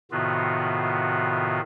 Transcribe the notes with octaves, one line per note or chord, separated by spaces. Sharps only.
A2 C3 D#3 B3 F4 F#4